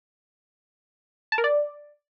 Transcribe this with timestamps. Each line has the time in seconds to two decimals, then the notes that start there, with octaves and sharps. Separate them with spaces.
1.32 A5
1.38 A#4
1.44 D5